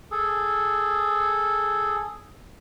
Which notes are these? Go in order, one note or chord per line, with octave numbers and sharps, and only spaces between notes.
G#4 A4